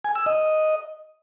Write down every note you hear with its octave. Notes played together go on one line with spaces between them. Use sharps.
G#5
E6
D#5